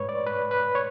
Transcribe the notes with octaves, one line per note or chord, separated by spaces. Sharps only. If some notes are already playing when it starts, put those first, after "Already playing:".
Already playing: G#2 G#3 B4 C#5
D5
B4
B4
C#5